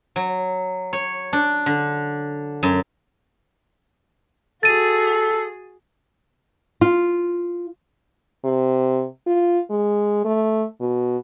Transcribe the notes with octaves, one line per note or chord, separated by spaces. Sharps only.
F#3
C#5
D4
D3
F#2
F#4 G#4 A4 A6 D#7
F4
C3
F4
G#3
A3
B2